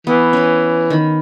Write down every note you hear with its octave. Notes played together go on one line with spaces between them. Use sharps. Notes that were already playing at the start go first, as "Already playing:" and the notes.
E3 B3
C#4 B4
D#3 B5